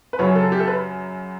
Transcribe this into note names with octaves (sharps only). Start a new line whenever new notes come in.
B4
F#2 C#3 F#3 C#4 C#5
A4
G4
A4
B4